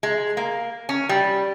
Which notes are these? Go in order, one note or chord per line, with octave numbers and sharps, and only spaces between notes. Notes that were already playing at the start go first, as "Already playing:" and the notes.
G#3
A#3
C#4
G3